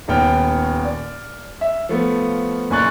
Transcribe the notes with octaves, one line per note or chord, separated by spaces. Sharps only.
D#1 D#2 B3 G5 F6
D5
E5
F3 A3 B3
F#1 A#2 G#5 C#6 F#6 A6